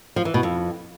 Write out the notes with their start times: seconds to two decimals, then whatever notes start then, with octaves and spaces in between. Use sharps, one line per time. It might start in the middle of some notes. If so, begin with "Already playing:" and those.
0.16 F3
0.25 E3
0.34 B2
0.43 F2